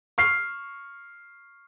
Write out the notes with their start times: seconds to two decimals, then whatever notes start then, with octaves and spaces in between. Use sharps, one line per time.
0.18 C#6 F6 C7